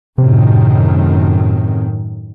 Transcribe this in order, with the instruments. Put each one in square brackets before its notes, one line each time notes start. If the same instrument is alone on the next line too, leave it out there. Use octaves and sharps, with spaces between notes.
[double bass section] F#2 A2 D#3 [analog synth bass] C3